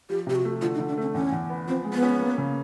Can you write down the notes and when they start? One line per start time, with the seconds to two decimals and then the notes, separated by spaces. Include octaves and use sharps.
0.10 F3 G4
0.27 C3 G4
0.36 F#4
0.45 A3
0.62 D3 F4
0.75 D#4
0.80 D3
0.88 D4
0.97 A3 C#4
1.14 E2 C#4
1.32 E2
1.50 B3
1.67 F3 C4
1.85 G#3
1.93 B3
2.02 C#4
2.21 A#3
2.38 C#3